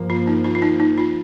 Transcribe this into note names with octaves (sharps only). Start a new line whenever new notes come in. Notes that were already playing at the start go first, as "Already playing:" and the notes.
Already playing: G2 F3 A#3
F4
D#4
F4
F4
D#4
D#4
F4